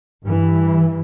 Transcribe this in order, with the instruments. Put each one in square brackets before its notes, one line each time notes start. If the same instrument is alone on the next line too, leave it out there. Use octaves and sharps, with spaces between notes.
[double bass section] G2 E3